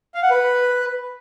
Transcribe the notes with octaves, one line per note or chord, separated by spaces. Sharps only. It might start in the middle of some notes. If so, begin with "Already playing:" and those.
F5
F#5
B4